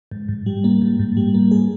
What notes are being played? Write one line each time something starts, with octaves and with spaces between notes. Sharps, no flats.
G#2
G#2
G3
A#3
G#2
G#2
G3
A#3
G#4